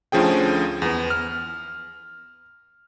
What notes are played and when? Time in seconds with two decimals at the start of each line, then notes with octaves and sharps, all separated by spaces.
0.12 D2 D3 F3 C#4 G#4 G5
0.82 E2 B3
1.10 F6